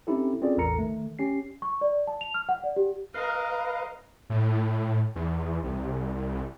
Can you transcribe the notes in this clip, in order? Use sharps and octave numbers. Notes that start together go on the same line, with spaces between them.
C4 C#4 D#4 E4 G4 A4
C4 C#4 F4 G#4 A4 D5
A1 E2 A4 A#4 A#5 C#7
D#3 A3
C#4 G4 C7
C#6
D5
A5
F7
F6
F#5
D5
G4
A#4 B4 D#5 F5
A2
E2
C2